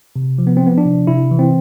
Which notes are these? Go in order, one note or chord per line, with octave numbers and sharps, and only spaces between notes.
C3
F3
B3
C4
F3 B3
D4
C3
C3 E4
E3
C4